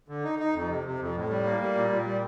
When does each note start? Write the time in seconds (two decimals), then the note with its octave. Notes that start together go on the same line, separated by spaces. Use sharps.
0.08 D3
0.24 D#4
0.39 D#4
0.54 F2
0.69 C3
0.84 C3
1.00 F2
1.15 A2
1.29 G3
1.45 A#3
1.60 G3
1.76 A#2
1.90 A#2
2.06 G3